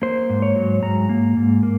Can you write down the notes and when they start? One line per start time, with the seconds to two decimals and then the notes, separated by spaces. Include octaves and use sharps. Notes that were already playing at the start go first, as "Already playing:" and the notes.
0.02 A#3 C5
0.30 G#2
0.42 C#5
0.56 F#3
0.82 G#2 A#5
1.09 A#3
1.37 G#2
1.63 A#3